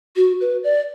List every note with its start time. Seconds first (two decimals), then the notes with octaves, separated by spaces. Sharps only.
0.16 F#4
0.41 B4
0.64 D5